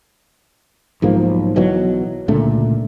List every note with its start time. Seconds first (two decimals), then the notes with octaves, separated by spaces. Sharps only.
1.02 B1 G#2 F3 A#3
1.56 B1 B2 E3 F#3
2.28 C#2 A#2 D3 A3